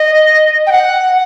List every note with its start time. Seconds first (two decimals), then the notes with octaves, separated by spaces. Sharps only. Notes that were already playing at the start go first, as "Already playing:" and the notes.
Already playing: D#5
0.67 G5
0.72 F#5